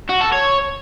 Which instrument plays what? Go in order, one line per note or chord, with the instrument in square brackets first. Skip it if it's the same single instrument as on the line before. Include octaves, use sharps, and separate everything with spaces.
[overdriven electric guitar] F#4
A4
C#5